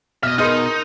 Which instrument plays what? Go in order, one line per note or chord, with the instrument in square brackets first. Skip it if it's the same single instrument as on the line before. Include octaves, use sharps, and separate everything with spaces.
[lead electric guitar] B2 [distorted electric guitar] D#5 E5 [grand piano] F6
[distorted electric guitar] D#4 [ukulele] G#4 B4 D#5 [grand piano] A#4 C6 F6